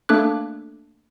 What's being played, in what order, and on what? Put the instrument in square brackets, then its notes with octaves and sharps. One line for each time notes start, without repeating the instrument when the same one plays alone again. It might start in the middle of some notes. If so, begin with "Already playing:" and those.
[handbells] A3 A#3 D4 A4 D6 F#6